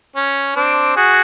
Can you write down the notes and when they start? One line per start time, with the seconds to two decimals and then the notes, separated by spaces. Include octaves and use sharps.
0.16 C#4
0.56 C4 D4
0.96 F#4 G#4